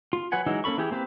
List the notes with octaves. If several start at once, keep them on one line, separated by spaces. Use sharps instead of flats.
F4
F#3 B4 C#5 F#5 G#5
E3 F#3 G#3 D#4 E4
A#3 C#4 A4 B5 C#6
E3 E4 G4 G#4
A#3 C4 G4 B4